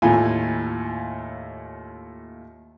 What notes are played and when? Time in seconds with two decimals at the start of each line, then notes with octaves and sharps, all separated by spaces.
0.02 D#2 A2 F4 G#5